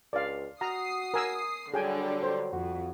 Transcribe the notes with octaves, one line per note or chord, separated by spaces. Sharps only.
C#2 D5 F5
F#4 A#5 D#6 C7
A#4 G#5 E6
D3 F#3 G3 G#4 G5 G#5
C5
F2 F#4